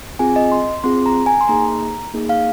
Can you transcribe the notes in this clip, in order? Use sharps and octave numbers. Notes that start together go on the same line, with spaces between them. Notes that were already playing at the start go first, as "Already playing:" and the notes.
C4 F4 G#4 G#5
D#5
C6
C4 F4 G#4 C6
A#5
G#5
C6
A#3 D#4 G#4 A#5
A#3 D#4 G#4
F5